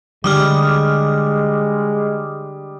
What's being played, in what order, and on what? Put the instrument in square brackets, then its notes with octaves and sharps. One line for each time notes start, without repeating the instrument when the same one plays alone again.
[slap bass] D3 [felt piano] G3 [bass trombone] G#3 [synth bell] D6 D#6 F6